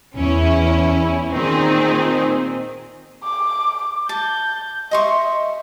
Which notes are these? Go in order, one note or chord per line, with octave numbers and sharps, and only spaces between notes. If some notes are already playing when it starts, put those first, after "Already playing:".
E2 C#4 E4
A#2 D#3 C4 D#4 G#4
D6
A5 G6
D#5 E5 C6 C#6